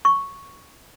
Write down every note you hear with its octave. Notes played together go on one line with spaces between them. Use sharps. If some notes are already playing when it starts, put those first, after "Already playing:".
C#6